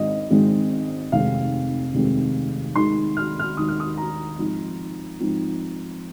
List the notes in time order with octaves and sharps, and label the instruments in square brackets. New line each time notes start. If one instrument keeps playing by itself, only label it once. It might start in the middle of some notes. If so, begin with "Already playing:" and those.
Already playing: [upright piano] G#1 G#2 G#3 C4 D#5
G#1 G#2 G#3 C4
F1 D#2 D#3 G#3 C4 F5
F1 D#2 D#3 G#3 C4
D#2 D#3 G#3 D#4 C6
F6
F6
D#2 D#3 G#3 D#4 D#6
F6
D#6
A#5
G#2 F3 C4 D#4
G#2 F3 C4 D#4